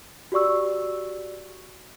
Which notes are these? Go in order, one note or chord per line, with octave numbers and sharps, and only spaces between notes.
F#4 G4 D5 C#6 E6